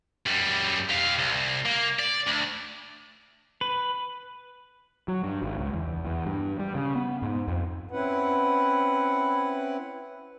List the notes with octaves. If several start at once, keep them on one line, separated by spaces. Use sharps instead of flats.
F#2 G3
G4 F5
C2
A#3
D5
D2
B4
F#3
G2
G#1
C#2
E2
E2
G2
G3
C#3
B3
G#2
F2
C4 C#4 E4 B4 F#5